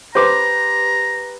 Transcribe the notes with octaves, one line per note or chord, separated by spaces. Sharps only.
G4 B4 C5 A#5 D6